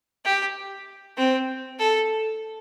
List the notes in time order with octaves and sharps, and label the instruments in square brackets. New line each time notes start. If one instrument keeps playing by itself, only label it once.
[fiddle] G4
C4
A4